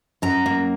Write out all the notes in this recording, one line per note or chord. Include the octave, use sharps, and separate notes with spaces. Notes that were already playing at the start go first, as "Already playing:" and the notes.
F#2 A#5
A#3